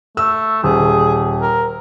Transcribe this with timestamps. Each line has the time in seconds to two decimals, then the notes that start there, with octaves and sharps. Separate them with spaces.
0.17 A3 E6
0.63 D#1 G#4
1.42 A#4